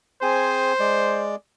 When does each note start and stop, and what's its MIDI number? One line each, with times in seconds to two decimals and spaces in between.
0.22 0.73 60
0.22 0.73 68
0.22 1.29 72
0.22 0.73 80
0.80 1.36 56
0.80 1.36 74